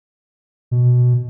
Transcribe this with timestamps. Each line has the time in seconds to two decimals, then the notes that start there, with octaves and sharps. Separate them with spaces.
0.71 B2